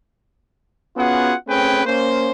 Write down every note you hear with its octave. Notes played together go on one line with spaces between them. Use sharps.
B3 C#4 F4 F#4 G#4 F#5
A3 C4 C#4 G#4 B4 G5
A#3 C#4 C5